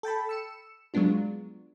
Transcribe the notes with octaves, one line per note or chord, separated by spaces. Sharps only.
A4 G5 A5 B5
E6 C#7 E7
F#3 G#3 B3 D4 F4